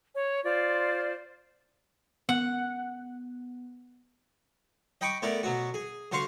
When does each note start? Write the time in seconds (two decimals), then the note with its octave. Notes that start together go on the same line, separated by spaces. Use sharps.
0.15 C#5
0.44 F4 C5 D5
2.29 B3 F#5
5.01 D#5 G5 B5 C#6 D6
5.22 A3 B3 E4 A#4 D5
5.43 B2 F#3 F#4
5.74 G#4
6.12 D3 F#4 C5 F5 C6 C#6